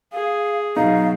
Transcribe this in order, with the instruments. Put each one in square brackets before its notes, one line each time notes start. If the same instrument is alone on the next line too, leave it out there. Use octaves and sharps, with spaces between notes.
[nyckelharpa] G#4 [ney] F5
[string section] B2 F#3 [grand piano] D#4 [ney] F5